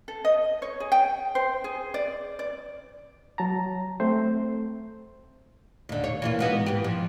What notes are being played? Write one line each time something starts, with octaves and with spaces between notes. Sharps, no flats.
A4
D#5
C#5
G#4
G5
C5
G#4
D5
D5
F#3 A5 A#5
A3 C4 C5
D#2 D3
C#5
E3 A#3 F4
G#2 B3 F#4
E3 G4
F3